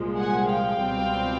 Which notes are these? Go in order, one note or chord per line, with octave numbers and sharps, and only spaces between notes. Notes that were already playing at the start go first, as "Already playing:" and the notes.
Already playing: C2 A#2 F3 G#3
F#5 G#5
F5 G5
C#2 B2 G3 C4